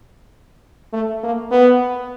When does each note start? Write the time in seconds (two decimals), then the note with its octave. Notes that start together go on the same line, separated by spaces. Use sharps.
0.93 A3
1.23 A#3
1.51 B3